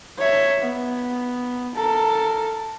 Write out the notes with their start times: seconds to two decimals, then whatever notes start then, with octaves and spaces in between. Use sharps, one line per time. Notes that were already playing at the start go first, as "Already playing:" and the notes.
0.19 C#5 E5
0.61 B3
1.75 A4 A#4